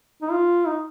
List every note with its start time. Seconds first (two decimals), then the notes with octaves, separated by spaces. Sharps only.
0.22 D#4
0.32 F4
0.67 D#4